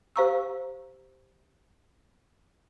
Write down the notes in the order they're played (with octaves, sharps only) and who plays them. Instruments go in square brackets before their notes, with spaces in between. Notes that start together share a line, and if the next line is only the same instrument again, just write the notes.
[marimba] G4 C5 F5 A#5 C#6 E6